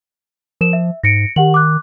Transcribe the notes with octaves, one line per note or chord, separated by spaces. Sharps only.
F3 A#4 E7
E5
G#2 A#6 C#7 D7
D#3 G4 F#5 F#7
D6 F#6